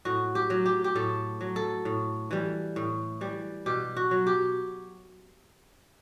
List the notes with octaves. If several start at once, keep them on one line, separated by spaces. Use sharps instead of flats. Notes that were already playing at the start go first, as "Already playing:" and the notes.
A2 F#4
G4
F#3
G4
G4
A2 A4
F#3
A4
A2
E3 G3
A2
E3 G3
B2 G4
F#4
F#3
G4